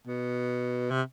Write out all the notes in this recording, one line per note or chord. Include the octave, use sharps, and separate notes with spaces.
B2
C3